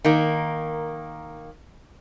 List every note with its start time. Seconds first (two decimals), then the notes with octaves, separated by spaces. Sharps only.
0.05 D#3 A#3